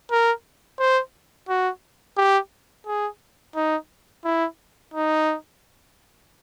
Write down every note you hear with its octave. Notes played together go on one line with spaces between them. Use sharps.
A#4
C5
F#4
G4
G#4
D#4
E4
D#4